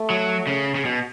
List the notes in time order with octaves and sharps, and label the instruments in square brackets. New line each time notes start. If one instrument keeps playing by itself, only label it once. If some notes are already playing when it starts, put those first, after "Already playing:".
Already playing: [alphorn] A3
[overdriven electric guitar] F#3
C#3
C#3
B2